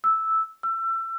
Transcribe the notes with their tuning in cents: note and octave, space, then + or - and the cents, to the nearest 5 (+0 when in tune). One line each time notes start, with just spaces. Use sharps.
E6 -5
E6 +30